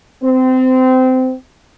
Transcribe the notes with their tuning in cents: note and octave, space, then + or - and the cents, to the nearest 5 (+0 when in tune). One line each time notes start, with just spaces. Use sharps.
C4 -25